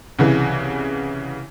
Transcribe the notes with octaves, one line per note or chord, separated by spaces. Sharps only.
C2 C#3 E3